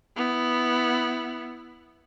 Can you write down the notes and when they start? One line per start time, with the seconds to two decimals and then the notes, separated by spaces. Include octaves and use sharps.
0.16 B3 E4